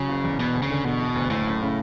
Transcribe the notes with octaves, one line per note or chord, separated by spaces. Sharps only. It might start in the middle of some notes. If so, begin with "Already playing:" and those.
Already playing: C#3 F#3
F#1
E2
E1 B2
D2
C#3
D3
E1 B2
E1
D2
F#1 A2
F#2
C#3